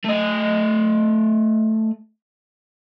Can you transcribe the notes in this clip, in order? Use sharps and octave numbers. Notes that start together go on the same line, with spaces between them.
A3 D#5